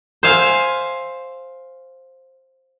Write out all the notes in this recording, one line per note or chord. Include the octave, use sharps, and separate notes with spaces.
C5 E5 F5 G#5